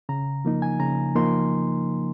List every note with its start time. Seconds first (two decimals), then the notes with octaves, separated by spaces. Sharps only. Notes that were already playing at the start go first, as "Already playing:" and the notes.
0.09 C#3 A#5
0.45 F3 A#3 D#4
0.62 G#5
0.80 C#3 A#5
1.16 F3 A#3 D#4 C6